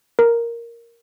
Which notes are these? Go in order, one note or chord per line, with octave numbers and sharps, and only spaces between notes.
A#4